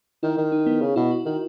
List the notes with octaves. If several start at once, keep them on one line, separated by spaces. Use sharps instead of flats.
D#3 E4
D#3
D#4
B3
C#3
B2 E4
F#4
D#3 F#4